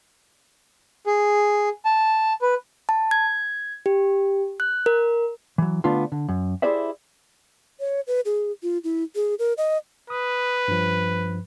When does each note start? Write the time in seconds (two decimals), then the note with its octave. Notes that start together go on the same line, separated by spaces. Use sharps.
1.06 G#4
1.85 A5
2.42 B4
2.89 A5
3.11 G#6
3.86 G4
4.60 F#6
4.86 A#4
5.58 E3 F#3
5.84 D3 A3 B3 D4 F4
6.12 D3
6.29 F#2
6.62 E4 G4 G#4 C5 D5 E5
7.80 C#5
8.07 B4
8.25 G#4
8.63 F4
8.84 E4
9.15 G#4
9.39 A#4
9.58 D#5
10.10 B4 D#6
10.68 G2 F3